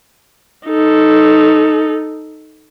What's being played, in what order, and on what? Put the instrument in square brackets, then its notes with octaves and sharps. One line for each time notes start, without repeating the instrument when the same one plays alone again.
[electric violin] D#4 A4